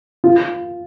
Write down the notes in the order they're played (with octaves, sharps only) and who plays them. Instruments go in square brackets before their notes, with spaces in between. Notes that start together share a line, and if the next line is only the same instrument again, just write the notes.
[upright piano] F4